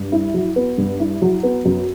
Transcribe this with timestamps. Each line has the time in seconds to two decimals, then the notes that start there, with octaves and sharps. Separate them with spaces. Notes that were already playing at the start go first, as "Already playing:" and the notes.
Already playing: G2
0.12 E4
0.34 F#3
0.56 B3
0.78 G2
1.00 E4
1.22 F#3
1.43 B3
1.65 F#2